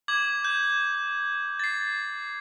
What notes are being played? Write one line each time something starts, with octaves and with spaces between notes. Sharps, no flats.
D6 G#6 F#7
G6
A6 C7